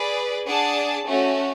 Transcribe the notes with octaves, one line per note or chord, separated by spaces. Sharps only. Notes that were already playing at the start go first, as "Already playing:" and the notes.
Already playing: G#4 B4 D5
D4 G#4 D5 F#5 A5
A3 C#4 F#4